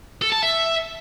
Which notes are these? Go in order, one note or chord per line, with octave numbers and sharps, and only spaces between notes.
A4
A5
E5